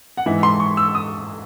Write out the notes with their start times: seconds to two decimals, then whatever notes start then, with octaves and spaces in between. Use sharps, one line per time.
0.17 F#5
0.26 G#2 E3 E5
0.43 C6
0.60 C#6
0.77 E6
0.95 D#6